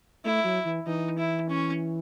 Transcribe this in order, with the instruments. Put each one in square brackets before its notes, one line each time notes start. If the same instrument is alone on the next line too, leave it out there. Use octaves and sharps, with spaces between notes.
[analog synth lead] A3 [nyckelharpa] E4
[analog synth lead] F#3
E3
[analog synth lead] E3 [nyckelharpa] D#4
[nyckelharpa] E4
C#4